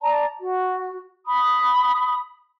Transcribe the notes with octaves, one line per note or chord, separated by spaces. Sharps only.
D5 A5 A#5
F#4
B5 D#6